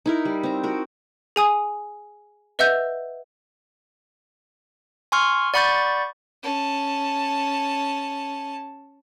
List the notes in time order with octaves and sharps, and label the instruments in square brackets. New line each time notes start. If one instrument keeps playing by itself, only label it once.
[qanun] D#4 E4 A#4
G3
C4 A#5
F#4 A#4
[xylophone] G#4 G#5 D#6
B4 D#5 E5 F#5 E6 G6
[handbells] G#5 C6 C#6 F6
D5 F#5 B5 C#6 G6 A6
[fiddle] C#4 A5